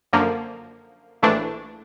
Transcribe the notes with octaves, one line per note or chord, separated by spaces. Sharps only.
F#2 D3 F3 A#3
A#1 A2 E3 A3 D4